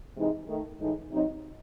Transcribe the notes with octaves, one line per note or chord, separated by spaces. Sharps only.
C3 E3 G#3 D#4
D#3 A3 D#4
A2 E3 G#3 D#4
C3 F#3 C4 D#4